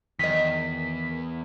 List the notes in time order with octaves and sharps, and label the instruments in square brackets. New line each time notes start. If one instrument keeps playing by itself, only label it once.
[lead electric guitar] E2 [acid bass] D#3 [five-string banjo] F#3 D#5 [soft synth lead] B6